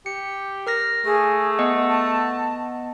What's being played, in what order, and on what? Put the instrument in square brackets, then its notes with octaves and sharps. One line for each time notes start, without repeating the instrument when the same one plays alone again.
[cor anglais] G4 [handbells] C#7
[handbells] A#4 F6 A#6
[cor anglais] A3 [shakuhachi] G#4
[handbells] B3 D#5 F#5
[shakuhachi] A5